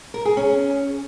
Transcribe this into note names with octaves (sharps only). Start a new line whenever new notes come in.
A#4
G#4
C#4